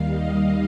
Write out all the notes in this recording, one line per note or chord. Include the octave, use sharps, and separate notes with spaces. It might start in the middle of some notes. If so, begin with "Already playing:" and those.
Already playing: D#2 D#3 G3 F5
D#5